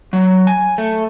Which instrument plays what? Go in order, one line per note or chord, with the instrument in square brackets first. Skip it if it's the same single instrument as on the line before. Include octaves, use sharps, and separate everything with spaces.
[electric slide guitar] F#3
G#5
A3